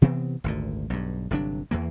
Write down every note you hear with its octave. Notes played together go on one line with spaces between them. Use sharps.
C3 E3 B3 C4
G#1 D2 A#2
B1 G2
G1 C3 F#3 D4
E2 E3 A#3